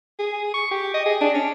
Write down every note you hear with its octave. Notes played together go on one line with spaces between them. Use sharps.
G#4
C#6
G4
D#5
G#4
D4
C#4